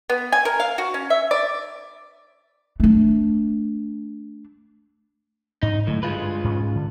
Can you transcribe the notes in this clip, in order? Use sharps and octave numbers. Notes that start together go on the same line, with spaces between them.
B3
G#5
A#4
F5
F#4
C#4
E5
D5
A3 D4
G#2 D#4
A2 D3 F#3 G#3
G2 G#3 F4 B4
G#2 C#4
D3